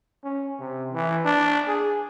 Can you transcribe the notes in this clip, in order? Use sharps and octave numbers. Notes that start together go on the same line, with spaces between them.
C#4
C3
E3
D4
G#4